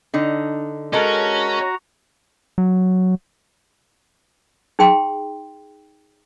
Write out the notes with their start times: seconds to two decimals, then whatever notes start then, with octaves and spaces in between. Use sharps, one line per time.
0.14 D3 D4 D#4
0.93 G#3 C#4 F#4 A4 A#4 D#5 A#5
2.58 F#3
4.79 D#4 G#4 G5 C6